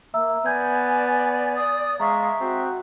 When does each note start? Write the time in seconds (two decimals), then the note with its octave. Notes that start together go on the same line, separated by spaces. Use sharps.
0.14 A#3 E5 A#5 E6
0.46 B3 D5 G#5 G6 G#6
1.56 D#6
2.00 G#3 E5 F5 A#5 C#6 D#6
2.41 C4 F#4